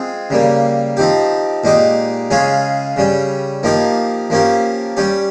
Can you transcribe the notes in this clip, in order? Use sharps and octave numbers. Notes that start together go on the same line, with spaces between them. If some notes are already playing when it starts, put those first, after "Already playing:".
Already playing: G#3 C4 F4 G#4
C#3 G3 A#3
F3 C4 D#4 G4
A#2 G#3 D#4 G4
C#3 G#3 C#4 F4 G#4
C#3 G3 C#4
F3 A#3 D#4 G4
F3 A#3 C#4 G4
G3 C#4 G4